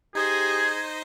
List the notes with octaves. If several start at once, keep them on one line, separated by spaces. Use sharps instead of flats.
D#4 G4 G#4 C5 D#5 G#6